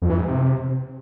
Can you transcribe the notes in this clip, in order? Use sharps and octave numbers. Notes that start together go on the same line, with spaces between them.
F2
E3
G#2
C3